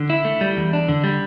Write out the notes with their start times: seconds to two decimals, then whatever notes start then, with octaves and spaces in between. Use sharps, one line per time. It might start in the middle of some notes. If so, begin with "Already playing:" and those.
Already playing: D3
0.10 E4
0.25 A3
0.41 G3
0.57 E2
0.73 D4
0.89 D3
1.04 G3